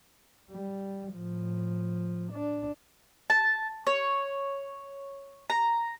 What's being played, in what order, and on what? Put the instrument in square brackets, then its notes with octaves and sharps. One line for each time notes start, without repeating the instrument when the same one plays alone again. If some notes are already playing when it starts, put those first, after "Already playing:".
[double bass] G3
A2 F3
D4
[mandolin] A5
C#5
A#5